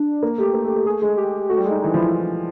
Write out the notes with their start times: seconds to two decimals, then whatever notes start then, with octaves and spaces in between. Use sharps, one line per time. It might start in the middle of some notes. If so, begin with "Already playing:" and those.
Already playing: D4
0.23 A#3
0.38 A3 G4
0.54 A#3
0.64 A3
0.76 A3
0.86 A3 G#4
1.02 G#3
1.17 G4
1.49 A3 F#4
1.58 G3
1.65 G#3
1.70 D#4
1.81 E3 D#4
1.94 F3 E4